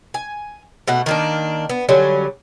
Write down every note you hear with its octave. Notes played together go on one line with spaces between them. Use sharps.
G#5
B2 A3 F#5
D#3 A#3 D4
B3
D3 F#3 G3 C#4